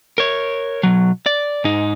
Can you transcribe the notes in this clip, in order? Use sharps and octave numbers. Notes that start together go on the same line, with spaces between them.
A#4 C#5
B1 F#3
D5
G#2 D#4